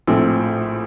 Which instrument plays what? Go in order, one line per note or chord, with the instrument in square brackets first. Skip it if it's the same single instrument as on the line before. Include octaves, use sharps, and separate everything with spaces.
[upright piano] A#1 A2 F3 C4